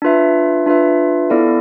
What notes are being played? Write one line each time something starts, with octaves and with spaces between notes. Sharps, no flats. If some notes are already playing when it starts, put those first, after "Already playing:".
D4 F4 B4 E5
D4 F4 B4 E5
B3 E4 A4 D5 F5